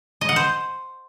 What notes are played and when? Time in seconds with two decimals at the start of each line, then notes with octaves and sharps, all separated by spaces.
0.21 D#5
0.29 F#5
0.36 C5